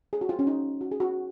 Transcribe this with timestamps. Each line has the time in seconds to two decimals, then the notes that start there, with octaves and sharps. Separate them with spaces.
0.13 G#4
0.21 F#4
0.29 F4
0.39 C#4
0.47 D#4
0.81 F#4
0.91 G#4
1.00 F#4